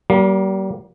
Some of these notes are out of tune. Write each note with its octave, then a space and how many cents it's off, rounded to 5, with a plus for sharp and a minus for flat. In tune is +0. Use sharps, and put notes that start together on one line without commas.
G3 -35 A#3 +20